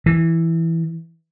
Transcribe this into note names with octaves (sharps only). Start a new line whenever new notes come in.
E3